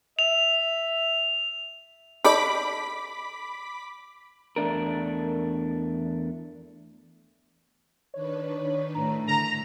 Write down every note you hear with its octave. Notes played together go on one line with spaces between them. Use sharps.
E5 F7
D#4 A4 D5 B5 D6 B6
E2 A3 D4 A#4
D#3 D4 B4 C#5
A2 A#5
D3 A#5 B6